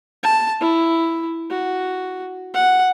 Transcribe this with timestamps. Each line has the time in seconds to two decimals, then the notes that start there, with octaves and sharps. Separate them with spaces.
0.23 A5
0.61 E4
1.50 F#4
2.54 F#5